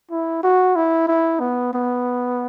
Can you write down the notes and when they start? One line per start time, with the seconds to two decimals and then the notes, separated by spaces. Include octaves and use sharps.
0.11 E4
0.43 F#4
0.76 E4
1.08 E4
1.40 B3
1.73 B3